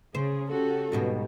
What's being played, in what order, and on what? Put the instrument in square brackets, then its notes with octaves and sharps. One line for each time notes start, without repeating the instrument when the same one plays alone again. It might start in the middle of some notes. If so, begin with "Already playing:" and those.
[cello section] C#3 [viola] G#4 [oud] C5
[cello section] C#3 C#4 F#4 [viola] G4 A4
[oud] D#2 G#2 B2 [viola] G3